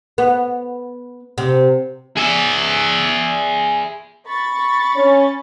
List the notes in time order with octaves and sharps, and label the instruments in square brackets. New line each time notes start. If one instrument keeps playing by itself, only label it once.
[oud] B3
C3
[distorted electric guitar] G#4 E5
[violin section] B5 C#6 A6
[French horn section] C#4